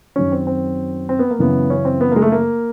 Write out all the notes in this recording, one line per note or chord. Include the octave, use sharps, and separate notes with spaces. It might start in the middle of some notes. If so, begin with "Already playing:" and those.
F#2 D#3 F#3 C#4
C4
C4
C4
B3
A#3
F#2 C#3 E3 B3
C#4
C4
B3
G#3 A#3
A3
A#3